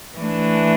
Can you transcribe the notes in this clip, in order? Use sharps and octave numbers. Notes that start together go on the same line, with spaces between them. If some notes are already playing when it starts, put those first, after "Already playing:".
E3 A3 D4